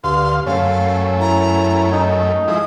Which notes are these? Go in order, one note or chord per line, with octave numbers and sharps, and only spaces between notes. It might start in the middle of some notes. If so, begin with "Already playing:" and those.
D2 G2 F5 C6
F#2 A3 C#4 F5
E4 A#5
D#4
F3 G#3 E4 D#6